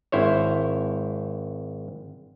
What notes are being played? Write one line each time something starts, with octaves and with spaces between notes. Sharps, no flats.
G#1 E4 C5 C#5